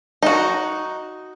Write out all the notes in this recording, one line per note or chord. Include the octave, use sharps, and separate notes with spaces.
D#4 F#4